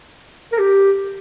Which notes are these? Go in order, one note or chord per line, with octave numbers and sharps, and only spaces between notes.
A#4
G4